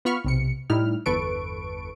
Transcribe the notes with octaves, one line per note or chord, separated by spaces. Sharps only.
B3 F4 B5 C#6 F6
B1 C3 C#7
A2 G3 D#4 E4 F6
G1 E2 A4 B4 C#6 D7